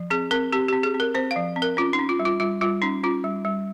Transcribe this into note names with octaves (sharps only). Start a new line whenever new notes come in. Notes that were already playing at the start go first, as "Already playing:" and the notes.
Already playing: F3
C4 G#4
C4 A#4
C4 G4
C4 G4
G#4
C4
A#4
C4 C5
F5
F3
C4
A#4
C#4 F4
D#4
C#4
F4
G3
F4
G3 F4
G3 F4
C#4 D#4
C#4 F4
G3
G3